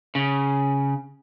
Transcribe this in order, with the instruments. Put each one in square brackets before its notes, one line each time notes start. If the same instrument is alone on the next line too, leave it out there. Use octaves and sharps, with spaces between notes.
[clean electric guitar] C#3